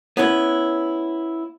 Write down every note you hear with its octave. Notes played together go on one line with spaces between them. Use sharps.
B3 C#4 E4